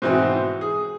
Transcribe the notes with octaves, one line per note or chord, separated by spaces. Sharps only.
G#2 B2 E3 B3 C4
G#4